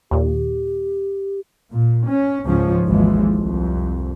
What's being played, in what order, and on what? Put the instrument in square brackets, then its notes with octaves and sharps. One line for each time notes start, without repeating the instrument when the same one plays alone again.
[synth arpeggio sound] D#2 A#2 [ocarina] G4
[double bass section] A#2
C#4
C#2 G#2 F3 C#4
G#1 D#2 E3 F3 G#3
C2 F2